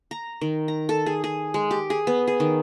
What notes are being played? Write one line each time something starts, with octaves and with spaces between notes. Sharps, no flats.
A#5
D#3
A#5
A4
G#4
G#4
G#3
G4
G#4
B3
G#4
D#3